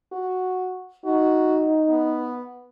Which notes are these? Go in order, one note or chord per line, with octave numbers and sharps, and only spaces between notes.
F#4
D#4 F#4
B3